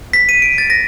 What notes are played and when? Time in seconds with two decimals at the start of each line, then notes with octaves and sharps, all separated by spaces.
0.13 B6
0.29 D#7
0.42 D7
0.58 A6
0.70 A#6